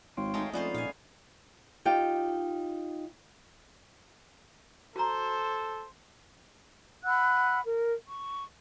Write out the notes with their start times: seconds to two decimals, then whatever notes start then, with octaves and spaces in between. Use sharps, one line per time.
0.17 G#1 C#5 F5 G5 C6
0.34 G#3 A3 D#4
0.53 F2 A3 B3 C#4 C5 D5
0.74 A#2 D#4 F5 G#5
1.85 D#4 F4 G4 G5
4.96 F#4 A4 C5 A#5
7.05 F#5 B5 E6 F#6
7.65 A#4
8.07 C#6